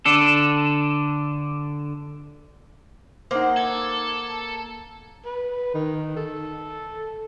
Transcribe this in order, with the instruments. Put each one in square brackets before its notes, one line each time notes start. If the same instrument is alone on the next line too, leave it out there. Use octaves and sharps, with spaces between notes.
[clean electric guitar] D3 D4 A4
[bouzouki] A#3 F#5 [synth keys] D#4 C5
[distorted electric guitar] A4 [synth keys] G#6
[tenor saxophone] B4
D#3
A4